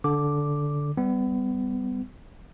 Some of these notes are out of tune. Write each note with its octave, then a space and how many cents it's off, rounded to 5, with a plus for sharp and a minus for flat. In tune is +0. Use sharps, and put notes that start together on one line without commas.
D3 -10 D6 +0
G3 +0 B3 +30